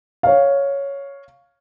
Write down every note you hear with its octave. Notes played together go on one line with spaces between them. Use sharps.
C#5 F5